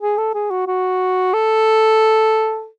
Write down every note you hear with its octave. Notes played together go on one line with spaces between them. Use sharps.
G#4
A4
G#4
F#4
F#4
A4